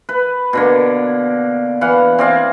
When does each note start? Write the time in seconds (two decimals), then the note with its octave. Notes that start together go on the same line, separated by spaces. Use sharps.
0.09 B4
0.53 B2 D3 A#3
1.81 E3 F5 F#5
2.18 C4 D5 F5 G#5